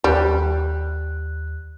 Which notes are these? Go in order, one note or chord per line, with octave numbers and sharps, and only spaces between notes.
D#2 G3 F#6